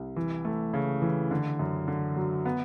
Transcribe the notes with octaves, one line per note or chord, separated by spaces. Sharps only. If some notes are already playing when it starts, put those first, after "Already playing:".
Already playing: C2
E3
A3
C#3
E3
D3
F#2
D3
F#3
B3